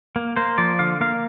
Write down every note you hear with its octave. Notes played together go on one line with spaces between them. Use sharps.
A#3
A#3 C5
F3 D5
D3 F5
A#3 F5